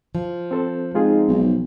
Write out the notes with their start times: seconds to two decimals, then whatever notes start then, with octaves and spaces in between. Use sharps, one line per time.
0.15 F3
0.51 C4 A4 C5
0.95 G#3 C4 D#4 F4 G#4
1.28 B1